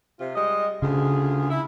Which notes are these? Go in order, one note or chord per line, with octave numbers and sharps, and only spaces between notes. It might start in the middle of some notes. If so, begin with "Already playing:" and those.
C3 F4
G3 G#3 D#5
D2 C#3 F4 G#4
E4